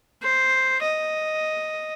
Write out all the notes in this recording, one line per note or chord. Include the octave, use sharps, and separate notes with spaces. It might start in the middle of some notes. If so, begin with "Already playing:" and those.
C5
D#5